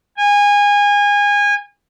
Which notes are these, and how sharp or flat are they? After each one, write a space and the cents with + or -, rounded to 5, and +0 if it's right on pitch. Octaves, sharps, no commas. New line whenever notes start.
G#5 -25